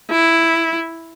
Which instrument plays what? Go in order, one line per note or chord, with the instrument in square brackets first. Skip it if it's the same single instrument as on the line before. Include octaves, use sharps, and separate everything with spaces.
[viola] E4